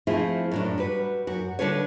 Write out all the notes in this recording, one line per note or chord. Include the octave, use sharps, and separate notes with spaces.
F3 A3 C4 E4 F4 G#4
F#2 A2 D4
G3 F#4 B4
F#2 F#4
D3 G3 D4 F4 B4 C#5